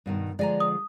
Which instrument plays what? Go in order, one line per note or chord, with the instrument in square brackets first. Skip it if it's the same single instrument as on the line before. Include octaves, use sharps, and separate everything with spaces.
[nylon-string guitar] G2 B2 D#3
[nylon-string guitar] D3 F3 G#3 [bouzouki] D5 G#5 A#5
[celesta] D#6